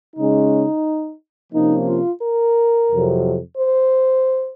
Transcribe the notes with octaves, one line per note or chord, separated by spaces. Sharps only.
C#3 G#3 C#4 D#4
C3 F3 A#3 C#4 D#4
F4
A#4
F2 C3 F#3
C5